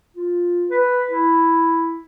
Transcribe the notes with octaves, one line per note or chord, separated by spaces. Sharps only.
F4
B4
E4